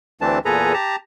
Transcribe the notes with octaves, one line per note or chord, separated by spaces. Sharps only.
D2 E3 A3 C4 D4 A5
E2 A#2 G#4 A4 B4 A#5
G4 A5 A#5